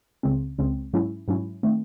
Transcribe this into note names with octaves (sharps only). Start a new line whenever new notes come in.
C#2 C#3 G#3 C4
C#2 C#3 G#3 C4
G#2 F#3 C#4 E4
G#2 F#3 C#4 E4
D#3 A3 C4